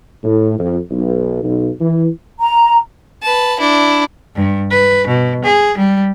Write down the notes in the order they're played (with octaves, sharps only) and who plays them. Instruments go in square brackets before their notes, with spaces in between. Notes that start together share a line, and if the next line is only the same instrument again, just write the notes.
[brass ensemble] A2
F2
B1
B1
E3
[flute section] A#5
[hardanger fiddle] B4 A5
D4 E4
[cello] G2
B4
B2
G#4
G3